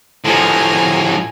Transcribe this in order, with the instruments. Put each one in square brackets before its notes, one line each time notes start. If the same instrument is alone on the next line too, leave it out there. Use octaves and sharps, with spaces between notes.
[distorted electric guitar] A2 F3 [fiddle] G#5 A#5